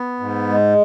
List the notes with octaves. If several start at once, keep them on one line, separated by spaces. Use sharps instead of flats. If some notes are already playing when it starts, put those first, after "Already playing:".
Already playing: B3
G#2
G#3